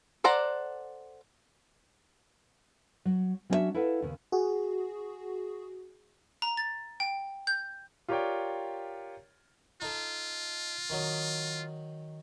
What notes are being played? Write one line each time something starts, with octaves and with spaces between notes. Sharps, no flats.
A4 C5 D5 F#5 A#5
F#3
F#3 C#4 D4 E4 F#4 E5
E4 A4 B4 F5 F#5
D#2 C#3
F#4 G#4
A#5
A6
G5
G6
F4 G4 A#4 C#5 D5 G5
D#4 F4 A4
D#3 F#3 D#6